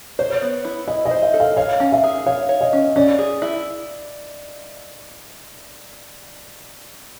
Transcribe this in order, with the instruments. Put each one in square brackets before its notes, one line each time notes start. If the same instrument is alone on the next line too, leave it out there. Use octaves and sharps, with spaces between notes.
[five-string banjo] C5 [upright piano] C#5
[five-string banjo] B3
E4
[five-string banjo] E4 [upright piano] D#5
[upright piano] D#5
[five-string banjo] C5
[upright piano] E5
[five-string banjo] A4
[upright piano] F5
[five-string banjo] C#5 [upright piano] F5
[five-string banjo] C#4
[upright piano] E5
[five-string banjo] G#4
[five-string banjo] C#5 [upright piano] F5
[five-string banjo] C#5
[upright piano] D#5
[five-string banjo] C#4
[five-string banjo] C#4 [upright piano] D5
[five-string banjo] G#4
E4